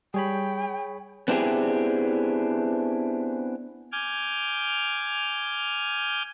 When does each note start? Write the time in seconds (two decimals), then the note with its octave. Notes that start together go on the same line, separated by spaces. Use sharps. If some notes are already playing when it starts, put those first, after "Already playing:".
0.14 G3 G#4 C#5 G5 B5
1.28 B3 C4 D4 E4 G4 G#4
3.92 G#5 D6 F6 G6